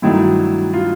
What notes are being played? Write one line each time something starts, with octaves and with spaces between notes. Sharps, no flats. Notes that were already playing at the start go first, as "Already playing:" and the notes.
G2 D#3 F#3 A3 E4
F4